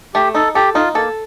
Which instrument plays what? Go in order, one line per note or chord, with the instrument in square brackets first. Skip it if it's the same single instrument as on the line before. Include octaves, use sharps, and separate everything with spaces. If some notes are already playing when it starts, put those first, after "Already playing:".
[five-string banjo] A3 [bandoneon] G4
[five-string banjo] D#4 [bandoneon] A4
[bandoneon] G4 [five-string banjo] A4
[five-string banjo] D#4 [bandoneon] F4
[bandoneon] A#3 [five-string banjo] A4